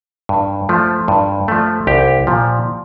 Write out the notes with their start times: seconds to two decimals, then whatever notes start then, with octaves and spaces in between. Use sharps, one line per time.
0.29 G2
0.69 F3 A3
1.08 G2
1.48 F3 A3
1.87 C2 G4
2.27 A#2 F3